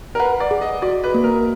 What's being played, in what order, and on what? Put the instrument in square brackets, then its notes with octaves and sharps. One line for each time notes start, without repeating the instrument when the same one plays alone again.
[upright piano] A#4
[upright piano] B4 [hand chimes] F#5
[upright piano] D5
[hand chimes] G#4
[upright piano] D#5
[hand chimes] F#4 [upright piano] D5
[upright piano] B4
[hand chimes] A#3
[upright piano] A#4